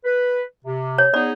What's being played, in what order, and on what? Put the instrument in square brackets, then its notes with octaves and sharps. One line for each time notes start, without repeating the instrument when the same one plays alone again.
[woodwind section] B4
C3
[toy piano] C#5
[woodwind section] B3 D#4 G#4 [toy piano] D5